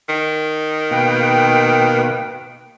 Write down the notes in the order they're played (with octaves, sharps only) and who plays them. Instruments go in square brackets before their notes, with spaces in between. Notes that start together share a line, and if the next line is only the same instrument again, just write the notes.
[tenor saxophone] D#3
[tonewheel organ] B2 A#3 B4 [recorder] G5